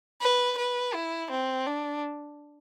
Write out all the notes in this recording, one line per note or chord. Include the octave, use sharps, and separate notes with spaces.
B4
B4
E4
C4
D4